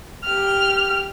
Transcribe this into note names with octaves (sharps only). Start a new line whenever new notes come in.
G4 F6